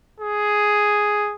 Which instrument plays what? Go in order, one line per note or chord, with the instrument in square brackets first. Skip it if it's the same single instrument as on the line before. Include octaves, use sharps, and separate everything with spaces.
[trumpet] G#4